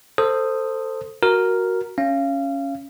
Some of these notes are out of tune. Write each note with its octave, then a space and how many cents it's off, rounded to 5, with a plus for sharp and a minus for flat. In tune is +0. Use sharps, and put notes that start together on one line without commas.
A4 +20 C5 +0 D#6 +0
F#4 +0 A#4 +0
C#4 +0 F5 -25